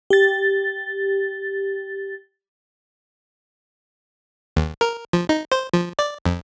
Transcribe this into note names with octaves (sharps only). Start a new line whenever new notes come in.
G4 A6
D#2
A#4
F3
D#4
C5
F3
D5
F2